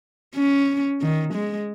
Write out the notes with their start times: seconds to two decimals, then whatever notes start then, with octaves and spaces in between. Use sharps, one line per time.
0.35 C#4
1.01 D#3
1.34 G#3